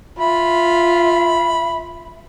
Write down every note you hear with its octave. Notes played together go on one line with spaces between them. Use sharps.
F4 E5 B5